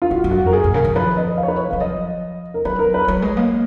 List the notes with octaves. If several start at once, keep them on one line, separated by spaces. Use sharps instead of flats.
F4
F#2 F#4
F#2
F#4
F2
A#4
F#2 G#4
A#2
C#3 A#4
D#3
F3 B4
D#5
F5
C#5
B4
C#5
F5
F#3
F3 D#5
A#4
F#3 B4
A#4
B4
F#3 C#5
G#3
A#3